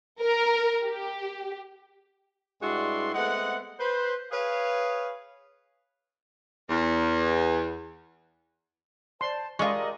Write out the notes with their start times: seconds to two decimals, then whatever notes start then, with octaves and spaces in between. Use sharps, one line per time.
0.21 A#4
0.86 G4
2.62 G2 G#3 E4 F#4 D5 C6
3.14 G#3 A3 B3 C4 F#5
3.80 B4 C5
4.31 G#4 B4 C#5 F5
6.69 E2
9.21 C5 D5 A5 C6
9.59 G#3 F4 G4 A#4 D5 D#5 C#6